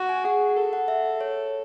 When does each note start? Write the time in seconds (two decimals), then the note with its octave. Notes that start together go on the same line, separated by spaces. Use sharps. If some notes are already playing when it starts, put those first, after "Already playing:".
Already playing: F#4
0.09 G#5
0.24 G#4 F#5
0.57 A4
0.73 F#5
0.88 E5
1.21 C#5